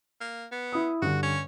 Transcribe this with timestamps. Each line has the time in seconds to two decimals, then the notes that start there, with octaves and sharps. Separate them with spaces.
0.21 A#3
0.52 B3
0.72 E4 D#6
1.02 G2 D3 F#4
1.23 C#4